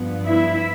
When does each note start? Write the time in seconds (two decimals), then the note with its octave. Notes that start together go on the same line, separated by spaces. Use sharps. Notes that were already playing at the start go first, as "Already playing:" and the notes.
Already playing: G2 F3 B3
0.26 E4 E5